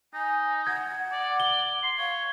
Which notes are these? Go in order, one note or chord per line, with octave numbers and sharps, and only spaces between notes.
D#4 G#5
F#5 G#6
D5
G7
C6
C#5 F5